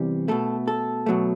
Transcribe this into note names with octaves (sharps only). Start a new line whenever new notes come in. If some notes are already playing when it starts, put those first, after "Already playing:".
Already playing: E2 C3 E3 G3
B2 A3 A4
A4
B2 F#3 A3